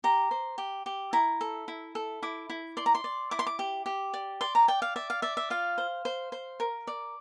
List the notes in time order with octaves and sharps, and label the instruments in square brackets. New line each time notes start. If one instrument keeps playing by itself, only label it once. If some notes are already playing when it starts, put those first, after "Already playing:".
[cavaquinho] G4 A#5
C5
G4
G4
E4 A#5
A4
E4
A4
E4 D6
E4
D5 C6
A#5
C6
D5
E4 D6
C6
D6
G4
G4
D5
D5 C6
A#5
D5 G5
F5
D5 E5
F5
D5 E5
E5
F4 F5
C5
C5
C5
A#4
D5